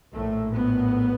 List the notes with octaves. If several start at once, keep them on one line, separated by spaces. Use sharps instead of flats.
A#1 A2 A3
B3